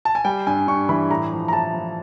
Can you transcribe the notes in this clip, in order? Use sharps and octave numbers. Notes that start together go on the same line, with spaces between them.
A5
G#5
G3 G5
G2 G#5
G2 C#6
E3 B5
A2 A#5
F3
A#5
A2 A5
F3